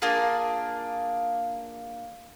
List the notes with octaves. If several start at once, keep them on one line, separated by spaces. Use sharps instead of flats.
A#3 D4 F4 G#4